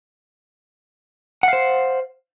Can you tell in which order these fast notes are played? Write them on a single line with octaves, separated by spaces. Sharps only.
F#5 F5 C5